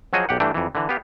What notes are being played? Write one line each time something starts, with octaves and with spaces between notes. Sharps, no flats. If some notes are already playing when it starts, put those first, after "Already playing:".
F3 F#3 F#4 G#4 C#5 D#5
B1 G4 F#5
G2 E3 A3 D4 G5
F2 E3
D3 E3
B3 G4 F5